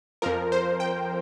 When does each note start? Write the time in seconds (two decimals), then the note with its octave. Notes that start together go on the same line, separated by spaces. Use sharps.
0.22 F2 F3 A#4
0.52 C5
0.80 G5